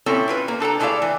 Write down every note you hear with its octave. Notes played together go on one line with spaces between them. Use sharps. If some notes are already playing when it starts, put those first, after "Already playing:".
A#2 C4 C#4 E4 A4
E4 F4 B4
A#3
D4 A4 G5 A#5
G#3 A3 E4 C5 D5 F5
E3